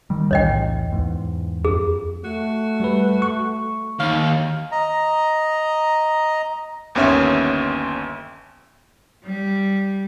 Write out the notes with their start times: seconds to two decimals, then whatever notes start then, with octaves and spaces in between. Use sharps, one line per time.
0.10 D#3 G3
0.31 B1 E2 A2 C#5 D#5 G5
0.92 E2 G#2
1.65 F2 G#4
2.24 A3 F#4
2.80 G3 B4
3.22 C#6
4.00 D#2 F5
4.72 D#5 A#5
6.95 G1 D#2 B3 C#4 E5 F6
9.25 G3